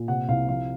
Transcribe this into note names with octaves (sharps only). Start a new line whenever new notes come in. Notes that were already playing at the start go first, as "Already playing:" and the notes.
Already playing: A#2
C3 F#5
C2 F5
F3 F5